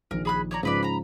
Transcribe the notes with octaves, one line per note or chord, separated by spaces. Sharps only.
A#1 D#3 A#4
G#4 B5 F#6
C#5 D5 A#5
G#2 C#3 F3 D#4 B4 D5
A#5 B5